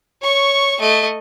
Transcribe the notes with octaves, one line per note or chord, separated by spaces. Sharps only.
C#5 C#6
A3 D#5